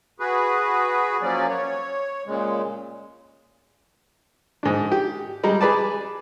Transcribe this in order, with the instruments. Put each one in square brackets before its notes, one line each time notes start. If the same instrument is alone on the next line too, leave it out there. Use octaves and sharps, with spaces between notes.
[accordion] F#4 G#4 B4
F3 F#3 A#3 C#4 D5
C#5
A#2 C#3 G#3
[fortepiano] G#2 D4
G4
G3 G#3 A#5
G#4 B4 D5 A5